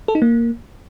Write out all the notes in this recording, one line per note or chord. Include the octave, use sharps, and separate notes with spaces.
A4
D#4
A#3